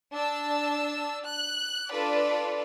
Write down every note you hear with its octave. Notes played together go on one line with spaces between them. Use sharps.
D4 A5 E6
F#6
D4 F4 A4 B4 D5